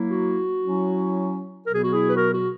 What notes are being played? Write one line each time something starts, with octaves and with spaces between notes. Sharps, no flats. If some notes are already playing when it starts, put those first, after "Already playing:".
Already playing: F#3 A#3 E4
F#4
F#3 C#4 E4
B2 F#3 B3 A#4
G#4
F#4
E4 G#4
B4
F#4 A#4
F#4